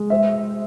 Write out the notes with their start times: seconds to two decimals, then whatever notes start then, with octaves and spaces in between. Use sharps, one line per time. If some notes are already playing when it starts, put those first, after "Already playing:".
Already playing: G#3
0.10 C5 E5